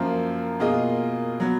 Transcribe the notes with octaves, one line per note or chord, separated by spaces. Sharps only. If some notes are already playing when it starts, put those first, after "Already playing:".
Already playing: F#2 F3 A#3 F4
B2 A#3 F4 G#4 D#5
F#3 B3